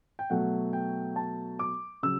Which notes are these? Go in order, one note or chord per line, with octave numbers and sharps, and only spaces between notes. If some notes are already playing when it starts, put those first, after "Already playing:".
G5
B2 F#3 A3 F#5
G5
A5
D6
C#3 F#3 E6